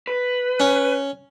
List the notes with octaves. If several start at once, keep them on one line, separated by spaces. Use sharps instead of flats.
B4
C#4